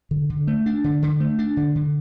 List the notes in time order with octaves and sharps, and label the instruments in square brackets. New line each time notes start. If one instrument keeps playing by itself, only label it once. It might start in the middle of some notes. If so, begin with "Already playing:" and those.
[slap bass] D3
D3
A3
D4
D3
D3
A3
D4
D3
D3